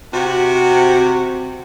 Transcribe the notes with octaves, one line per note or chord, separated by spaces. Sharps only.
C3 F#4